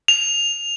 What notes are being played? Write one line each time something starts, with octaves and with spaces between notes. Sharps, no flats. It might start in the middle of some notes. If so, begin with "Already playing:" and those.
F7